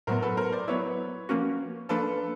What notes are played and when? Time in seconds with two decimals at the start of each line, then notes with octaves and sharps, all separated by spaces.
0.07 A2 F#3 B3 A#4 C5
0.22 A4 B4
0.37 A#4 C5
0.52 C5 D5
0.68 F#3 B3 E4 B4 C#5
1.29 F3 A#3 C#4 F#4
1.89 F3 A#3 D4 A4 B4